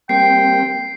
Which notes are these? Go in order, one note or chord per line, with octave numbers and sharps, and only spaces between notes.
G3 A#3 C4 G5 C7